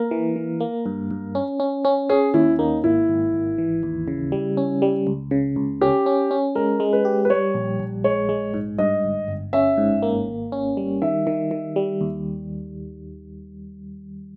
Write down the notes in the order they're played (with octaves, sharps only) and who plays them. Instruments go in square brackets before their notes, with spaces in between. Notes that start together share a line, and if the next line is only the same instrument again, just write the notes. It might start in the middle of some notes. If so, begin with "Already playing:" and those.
Already playing: [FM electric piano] A#3 [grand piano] A#4
[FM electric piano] E3
E3
A#3
G2
G2
C#4
C#4
C#4
[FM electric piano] C#4 [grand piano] G#4
[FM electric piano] D#2 [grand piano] E4
[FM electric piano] A#3 [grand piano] D#4
[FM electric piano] G#1 [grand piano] E4
[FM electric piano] G#1
G#1
E3
D#2
C#3
G3
C#4
G3
C#2
C#3
C#2
[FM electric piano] C#4 [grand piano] G4
[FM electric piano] C#4
C#4
[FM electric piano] G#3 [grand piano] A#4
[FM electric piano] G#3
[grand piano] B4
[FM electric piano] G4
[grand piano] B4
[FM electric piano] G3 [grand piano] C#5
[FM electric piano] A#1
A#1
[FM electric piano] G#3 [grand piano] C#5
[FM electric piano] G#3
G#2
[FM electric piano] G2 [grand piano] D#5
[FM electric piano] G1
G1
[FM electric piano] C#4 [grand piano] E5
[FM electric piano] G#2
A#3
G#1
C#4
G3
[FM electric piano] D#3 [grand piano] E5
[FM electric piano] D#3
D#3
G3
D#2